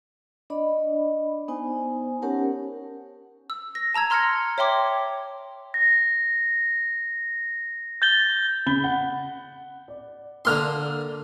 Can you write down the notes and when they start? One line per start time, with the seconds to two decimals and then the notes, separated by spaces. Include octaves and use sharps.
0.50 D4 D5 D#5 B5
1.48 B3 D#4 C5 G#5
2.22 C#4 G4 A#4 C#5 F#5 A5
3.50 E6
3.75 A#6
3.94 A5 A#5 E6 G#6
4.10 A#5 C6 F6 G#6 A#6 C#7
4.58 C#5 E5 G5 C6 D6
5.74 A#6
8.02 G6 A6 G7
8.66 C#3 B5 G7
8.84 F#5
9.88 D5
10.45 D3 A#3 C6 E6 F6